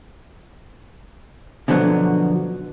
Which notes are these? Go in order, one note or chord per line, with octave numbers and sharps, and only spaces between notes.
B2 D3 F3 F#3 B3